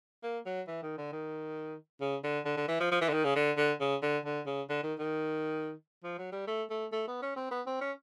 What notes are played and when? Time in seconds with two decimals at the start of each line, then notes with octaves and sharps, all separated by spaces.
0.23 A#3
0.46 F#3
0.68 E3
0.83 D#3
0.98 D3
1.12 D#3
2.01 C#3
2.24 D3
2.46 D3
2.57 D3
2.68 E3
2.80 F3
2.91 F3
3.01 E3
3.09 D3
3.13 D#3
3.24 C#3
3.36 D3
3.58 D3
3.80 C#3
4.03 D3
4.25 D3
4.46 C#3
4.69 D3
4.84 D#3
4.99 D#3
6.04 F3
6.18 F#3
6.33 G3
6.48 A3
6.71 A3
6.92 A3
7.08 B3
7.22 C#4
7.36 C4
7.51 B3
7.67 C4
7.81 C#4